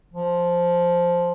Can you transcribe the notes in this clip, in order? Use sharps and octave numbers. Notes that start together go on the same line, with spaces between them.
F3